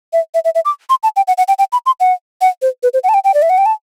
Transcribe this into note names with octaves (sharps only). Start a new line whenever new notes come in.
E5
E5
E5
E5
D6
C6
A5
G5
F#5
F#5
G5
G5
B5
C6
F#5
F#5
C5
B4
C5
F#5
A5
G5
G5
D5
E5
F#5
G5
A5